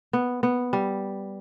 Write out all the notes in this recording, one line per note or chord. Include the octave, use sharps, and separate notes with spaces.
B3
B3
G3